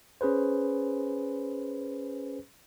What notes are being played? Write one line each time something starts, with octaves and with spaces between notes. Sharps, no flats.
C#4 G#4 B4 C5